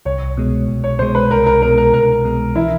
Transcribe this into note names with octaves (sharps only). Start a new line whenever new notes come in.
C2 C#5
B2 G#3
C2
C#5
B2 G#3 C5
B4
C2 A#4
A#4
B2 G#3 A#4
A#4
C2 A#4
B2 G#3
E3 E4